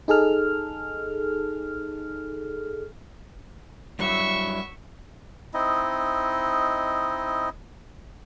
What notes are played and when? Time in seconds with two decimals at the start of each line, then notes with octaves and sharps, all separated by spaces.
0.08 D#4 G#4 A4 F6
3.99 G2 F#3 E4 E5 C#6
5.54 C4 D#4 E4 D#5